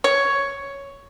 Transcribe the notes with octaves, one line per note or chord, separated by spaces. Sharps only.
C#5